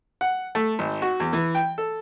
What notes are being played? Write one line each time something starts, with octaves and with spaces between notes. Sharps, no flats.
F#5
A3
G#1
F#4
E2
E3
G5
A4